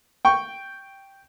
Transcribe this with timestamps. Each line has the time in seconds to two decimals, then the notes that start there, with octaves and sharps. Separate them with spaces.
0.25 G5 C#6